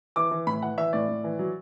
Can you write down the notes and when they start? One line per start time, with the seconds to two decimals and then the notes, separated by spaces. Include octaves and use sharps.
0.16 E3 D6
0.31 E3
0.47 A2 B5
0.62 E3 F#5
0.78 E3 E5
0.93 A2 D5
1.09 A2
1.24 E3
1.39 F#3